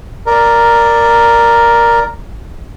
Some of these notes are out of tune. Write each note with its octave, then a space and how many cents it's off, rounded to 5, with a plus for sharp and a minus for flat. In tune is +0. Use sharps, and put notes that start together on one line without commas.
A#4 +0 D5 +0